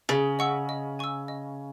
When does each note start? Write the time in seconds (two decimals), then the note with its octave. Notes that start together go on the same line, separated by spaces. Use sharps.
0.09 C#3 G#4
0.39 D#5 F#5 C#6 E6
0.69 D#5
0.99 G#5 C#6 E6
1.28 D#5